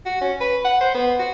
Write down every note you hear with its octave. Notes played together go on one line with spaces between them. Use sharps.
F#4
C#4
B4
F#5
C5
B3
F#4